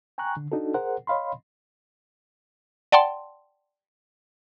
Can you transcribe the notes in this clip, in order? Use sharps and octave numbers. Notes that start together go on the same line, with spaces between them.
G5 G#5 A#5 C#6 F#6
D3
D4 D#4 F#4 A4
G#4 A#4 C5 F#5
C#5 D#5 F5 B5 C6
D5 F#5 G5 A5 C6